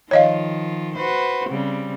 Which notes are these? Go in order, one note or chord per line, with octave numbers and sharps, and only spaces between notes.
D#3 F3 F4 C#5 D#5 F5
F#4 B4 C5
C#3 G3 C4